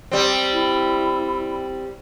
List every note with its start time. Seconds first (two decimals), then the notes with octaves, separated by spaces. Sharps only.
0.12 G3 C4
0.53 E4